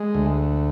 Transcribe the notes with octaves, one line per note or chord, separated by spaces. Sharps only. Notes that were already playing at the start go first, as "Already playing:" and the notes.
Already playing: G#3
D2